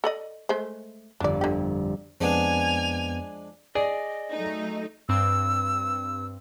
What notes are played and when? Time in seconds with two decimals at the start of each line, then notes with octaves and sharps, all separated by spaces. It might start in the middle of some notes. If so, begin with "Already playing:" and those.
0.04 A4 D5 D#5
0.49 G#3 A3 C5
1.20 G1 F2 D4 D5
1.41 D3 G4
2.21 F2 F3 G#3 B3 D4 G#5 F7
3.75 G#4 D5 D#5
4.32 F#3 A3 D#4
5.09 G2 C4 E6